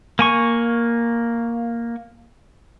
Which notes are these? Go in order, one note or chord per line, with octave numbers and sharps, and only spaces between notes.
A#3 G#5 C#6